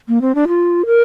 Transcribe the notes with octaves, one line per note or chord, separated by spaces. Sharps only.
A#3
C4
D4
F4
A#4